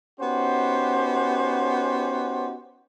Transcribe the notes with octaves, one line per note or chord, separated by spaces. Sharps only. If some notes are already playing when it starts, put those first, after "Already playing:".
B3 C#4 D#4 F#4 G4 C5